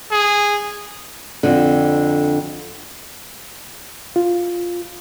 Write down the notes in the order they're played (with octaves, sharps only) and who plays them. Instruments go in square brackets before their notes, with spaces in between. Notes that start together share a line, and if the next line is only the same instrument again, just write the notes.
[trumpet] G#4
[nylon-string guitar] F2 D3
[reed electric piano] F4